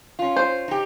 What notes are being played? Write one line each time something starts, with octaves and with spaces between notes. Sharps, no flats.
C#4 F4
C5
D#4 G4